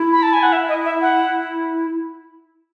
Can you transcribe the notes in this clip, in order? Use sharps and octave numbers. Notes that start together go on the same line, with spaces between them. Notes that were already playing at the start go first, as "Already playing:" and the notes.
Already playing: E4
B5
A5
G#5
F#5
E5
D#5
E5
F#5